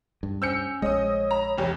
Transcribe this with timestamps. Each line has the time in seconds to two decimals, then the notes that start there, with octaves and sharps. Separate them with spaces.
0.23 G2
0.42 C#4 C5 G#5 E6 G6 C#7
0.82 A#1 G#3 C#5 D#5 D#6
1.31 A#5 B5
1.58 F1 E2 G4